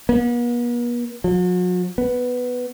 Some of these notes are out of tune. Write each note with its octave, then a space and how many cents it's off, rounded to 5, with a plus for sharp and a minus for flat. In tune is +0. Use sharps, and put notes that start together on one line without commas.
B3 -45
F#3 -45
B3 +5